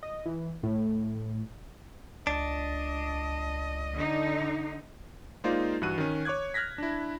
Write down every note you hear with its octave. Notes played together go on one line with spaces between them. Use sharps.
D#5
E3
A2
C#2 D4 D#5
D3 D#4
G#3 A#3 D#4 F4 C5 D5
G2 E3 F#4 F#6 D#7
D#3 C#4
C#5 C#6 D6 F#6 G#6
F6 F#6 G#6 A#6 B6
D4 E4